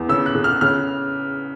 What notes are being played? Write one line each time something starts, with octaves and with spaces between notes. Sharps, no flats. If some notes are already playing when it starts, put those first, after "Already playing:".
Already playing: E2
C#3 E6
F#6
C#3
F6
C#3 F6